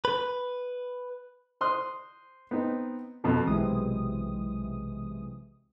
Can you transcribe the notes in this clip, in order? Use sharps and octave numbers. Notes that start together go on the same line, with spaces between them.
B4
C5 C6 D#6 F#6
B3 C4 D#4
F2 B2 F3
B1 C3 E3 G#3 D#6